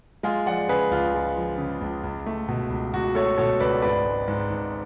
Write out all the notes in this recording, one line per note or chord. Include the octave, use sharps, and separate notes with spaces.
G#3 F4 G#4
F3 D5 F#5
C#3 G#4 B4
C#2 F4
G#3
F3
C#3
C#2
C#2
A3
B2
C#2
C#2 F#4
A3 A4 C#5
B2 A4 C#5
C#2 B4 D5
G#1 B4 D5
G#3
G#2
G#1